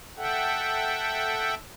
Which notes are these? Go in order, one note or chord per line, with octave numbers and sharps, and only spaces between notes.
A4 E5 F#5 G5